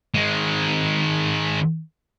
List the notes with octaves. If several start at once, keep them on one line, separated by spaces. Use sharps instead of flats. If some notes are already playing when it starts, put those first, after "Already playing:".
D#3 G#3